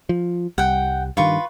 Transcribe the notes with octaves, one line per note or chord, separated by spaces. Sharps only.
F3
C2 G3 F#5 G5
G2 D#3 F4 B4 C#6